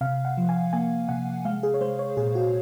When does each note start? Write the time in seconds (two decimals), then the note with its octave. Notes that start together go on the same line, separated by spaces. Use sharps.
0.01 C3 F5
0.25 F#5
0.37 F3
0.49 G#5
0.73 A#3 G#5
1.09 C3 F#5
1.45 G#3 F5
1.63 G#4
1.74 C#5
1.81 G#3 C5
1.99 C#5
2.17 A#2 G#4
2.35 F#4